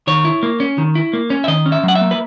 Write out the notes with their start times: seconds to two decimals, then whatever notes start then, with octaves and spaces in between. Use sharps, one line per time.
0.07 D#3 C#5
0.25 E4
0.43 A#3
0.60 C#4
0.78 D#3
0.95 E4
1.13 A#3
1.30 C#4
1.44 E5
1.48 D#3 D#5
1.66 C#4
1.72 E5
1.83 F#3 F#5
1.95 E5
2.01 A#3
2.11 B4